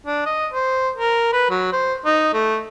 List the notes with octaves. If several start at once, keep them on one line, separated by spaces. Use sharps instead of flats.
D4
D#5
C5
A#4
B4
F#3
C5
D#4
A3